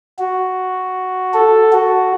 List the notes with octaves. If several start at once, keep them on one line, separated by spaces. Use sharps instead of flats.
F#4
A4
F#4